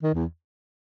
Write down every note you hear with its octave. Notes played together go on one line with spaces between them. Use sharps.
D#3
E2